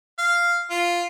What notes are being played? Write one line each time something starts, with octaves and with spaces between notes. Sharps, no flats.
F5
F4